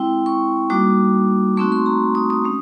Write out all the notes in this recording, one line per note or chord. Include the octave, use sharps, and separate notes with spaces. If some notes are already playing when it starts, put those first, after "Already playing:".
Already playing: G#3 C4 E4 G5
C#6
G3 A#3 D#4 F#4 D6
A3 C4 D#4 F#4 C#6
C6
A#5
D#6
D#6
G#3 C#4